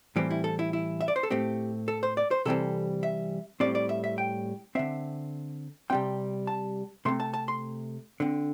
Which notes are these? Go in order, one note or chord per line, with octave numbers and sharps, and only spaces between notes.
A2 E3 G3 C4 G4
E4
A4
E4
E4
E5
D5
C5
A4
A2 A3 C4 G4
A4
C5
D5
C5
C3 E3 G3 C4 A4
E5
A2 G3 C4 D5
D5
E5
E5
G5
D3 C4 E5
C3 G3 C4 G5
A5
C3 A3 C4 C6
A5
A5
C6
D3 C4